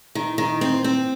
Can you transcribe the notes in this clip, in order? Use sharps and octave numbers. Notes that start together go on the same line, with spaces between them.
D#3
D#3
C4
C4